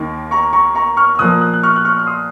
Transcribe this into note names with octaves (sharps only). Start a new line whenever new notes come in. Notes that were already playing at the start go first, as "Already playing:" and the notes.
Already playing: D#2 D#3 A#3
A#5 C#6
A#5 C#6
A#5 C#6
C#6 F6
F6
A#2 F3 A#3 D#6 F#6
D#6 F#6
F#6
C#6 F6
F#6
C#6 F6
F6
C6 D#6